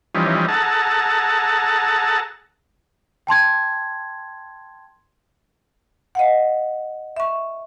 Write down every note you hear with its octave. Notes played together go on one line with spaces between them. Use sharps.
E3 F3 G3 C#4 D#4
G#4 A4 F#5 A5 A#5
G5 A5 C6 G#6
D#5 F5 F#5
E5 C#6